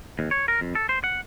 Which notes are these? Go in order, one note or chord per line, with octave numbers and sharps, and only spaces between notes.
D#2
C#5
A#4
F2
A4
C5
F#5